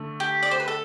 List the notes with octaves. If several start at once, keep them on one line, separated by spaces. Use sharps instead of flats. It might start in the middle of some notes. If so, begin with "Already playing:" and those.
Already playing: D3 A3
G4
D5
C5
B4
A4